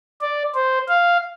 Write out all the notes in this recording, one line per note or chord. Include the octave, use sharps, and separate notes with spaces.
D5
C5
F5